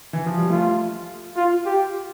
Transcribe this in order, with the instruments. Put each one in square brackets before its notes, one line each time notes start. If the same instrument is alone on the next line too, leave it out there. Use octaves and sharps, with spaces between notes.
[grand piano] E3
F3
G3
[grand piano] A3 [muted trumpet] F4
[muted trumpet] F4
G4